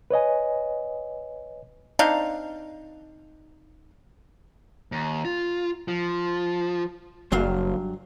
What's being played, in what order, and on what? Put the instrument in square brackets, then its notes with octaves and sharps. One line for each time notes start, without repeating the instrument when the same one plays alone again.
[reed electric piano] B4 C#5 D#5 G#5
[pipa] C4 D4 D#4 F5
[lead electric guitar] D#2
F4
F3
[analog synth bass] F#1 [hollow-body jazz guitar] G2 F#3 F5